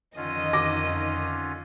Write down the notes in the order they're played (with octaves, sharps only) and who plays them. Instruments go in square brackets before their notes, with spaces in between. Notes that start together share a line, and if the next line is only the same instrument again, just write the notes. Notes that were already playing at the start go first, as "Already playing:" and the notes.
[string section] F2 D#3 D#5 [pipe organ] D3 C#4 F4
[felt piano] D6 A#6